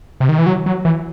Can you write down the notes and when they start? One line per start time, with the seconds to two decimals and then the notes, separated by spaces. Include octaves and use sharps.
0.20 C3
0.29 D#3
0.38 E3
0.46 F#3
0.66 F#3
0.85 E3